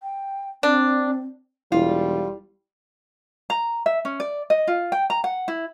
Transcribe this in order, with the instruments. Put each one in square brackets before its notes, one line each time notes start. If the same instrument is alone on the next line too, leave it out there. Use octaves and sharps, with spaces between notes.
[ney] G5
[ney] C4 [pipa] D4
[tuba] E1 [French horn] G3 [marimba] E4 [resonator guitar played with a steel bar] F4
[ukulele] A#5
E5
C#4
D5
D#5
F4
G5
A#5
F#5
E4